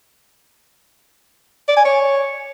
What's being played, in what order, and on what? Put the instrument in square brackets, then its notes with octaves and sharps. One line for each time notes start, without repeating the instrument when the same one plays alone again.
[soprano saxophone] D5
G#5
C#5